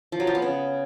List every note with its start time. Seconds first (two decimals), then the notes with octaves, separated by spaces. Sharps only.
0.12 F3
0.20 F#3
0.27 F3
0.35 B3
0.42 C#3